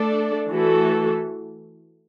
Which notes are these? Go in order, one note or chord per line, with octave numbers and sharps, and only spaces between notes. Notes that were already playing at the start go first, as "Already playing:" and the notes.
Already playing: A3 D4 A4 D5
E3 A3 F#4 A4